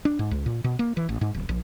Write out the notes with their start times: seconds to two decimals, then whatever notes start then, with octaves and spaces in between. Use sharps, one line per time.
0.05 D4
0.19 G#2
0.31 C#2
0.46 A#2
0.64 B2
0.79 A#3
0.97 E3
1.09 A1
1.21 G#2
1.34 D1
1.49 A#1